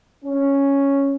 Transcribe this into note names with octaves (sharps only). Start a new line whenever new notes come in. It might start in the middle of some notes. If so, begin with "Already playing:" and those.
C#4